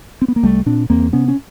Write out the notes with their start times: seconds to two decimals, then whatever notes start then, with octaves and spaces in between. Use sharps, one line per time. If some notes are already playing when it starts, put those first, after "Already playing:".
0.22 C4
0.28 B3
0.36 A#3
0.43 C2 G3 A3
0.66 A#2 C4 D4
0.90 E2 A#3 C4
1.12 C3 B3 C#4
1.28 C#4